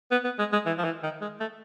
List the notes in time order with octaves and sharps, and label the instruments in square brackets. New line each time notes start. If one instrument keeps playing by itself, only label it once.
[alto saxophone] B3
B3
G#3
G#3
E3
F3
E3
D#3
G#3
A3